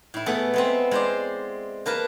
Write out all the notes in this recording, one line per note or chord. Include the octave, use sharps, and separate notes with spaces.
A2 E4
A3 B3 G#4 A4
G#3 B3 C4
G#3 C5 D5
A#3 A#4 B4 A5